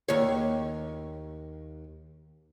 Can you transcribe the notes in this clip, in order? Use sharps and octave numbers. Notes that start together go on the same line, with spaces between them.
D#2 C#5